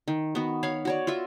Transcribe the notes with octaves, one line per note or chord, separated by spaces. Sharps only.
D#3
B3 F#4
C#5 F5 B5
F#4 C#5 D5
F4 F#4 E5